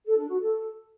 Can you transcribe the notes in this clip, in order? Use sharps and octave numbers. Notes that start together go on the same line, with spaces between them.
A4
D4
F#4
A4